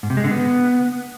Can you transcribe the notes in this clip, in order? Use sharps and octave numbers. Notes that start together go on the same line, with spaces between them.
G#2
C3
G#3
D3
B3